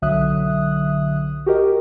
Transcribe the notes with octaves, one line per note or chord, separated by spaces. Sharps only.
B1 D3 F#3 E5 D#6 F#6
F#4 G4 A#4 D#5